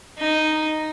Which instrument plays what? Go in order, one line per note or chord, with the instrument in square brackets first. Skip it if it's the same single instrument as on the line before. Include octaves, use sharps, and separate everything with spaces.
[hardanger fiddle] D#4